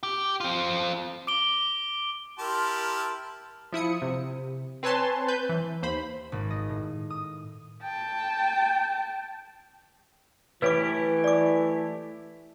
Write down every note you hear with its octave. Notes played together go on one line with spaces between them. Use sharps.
G4
C4 F4
D6 D7 G7
E4 G4 A#4 A5 C6 F6
F3 E4 D#6 C#7
C3
C4 B4 C#5 G#5 A5 C6
B4 G6
E3
D#2 C5 B5
G#1
D#5
A2
D#6
G5 A5
E3 A3 E4 G4 B4 C#5 D6
D5 D6